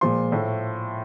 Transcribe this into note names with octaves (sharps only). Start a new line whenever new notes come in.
A#2 F3 G#3 C6
A2 F3 A3